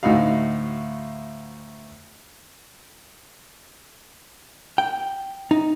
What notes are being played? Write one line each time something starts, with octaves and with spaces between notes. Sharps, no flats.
D2 A2 D#4 F#4 F5
G5
D#4